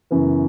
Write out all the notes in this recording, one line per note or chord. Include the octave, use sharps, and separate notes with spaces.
F#2 C#3 E3 B3